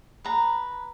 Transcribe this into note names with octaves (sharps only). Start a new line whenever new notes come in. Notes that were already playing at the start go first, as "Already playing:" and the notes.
B4 A#5